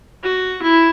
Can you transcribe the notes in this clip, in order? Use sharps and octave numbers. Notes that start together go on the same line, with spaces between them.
F#4
E4